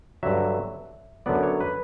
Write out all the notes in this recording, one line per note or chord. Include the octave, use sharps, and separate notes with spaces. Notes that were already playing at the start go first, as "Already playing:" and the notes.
G2 D3 F#3 E5
F#2 D3 F#3 B3 D5
C#5
B4